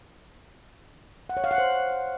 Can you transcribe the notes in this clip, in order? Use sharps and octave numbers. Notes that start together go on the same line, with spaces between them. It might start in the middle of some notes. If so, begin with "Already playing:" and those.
F#5
C#5
F5
F#5
C5